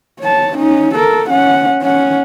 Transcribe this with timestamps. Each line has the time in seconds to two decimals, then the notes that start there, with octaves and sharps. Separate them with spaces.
0.20 C#5 A5
0.56 C#4 D#4
0.95 A4 A#4
1.30 C#4 F#5
1.82 C#4 F#5